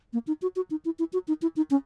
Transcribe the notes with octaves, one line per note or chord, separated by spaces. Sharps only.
A#3
D#4
F#4
F#4
D#4
E4
E4
F#4
D#4
E4
D#4
C#4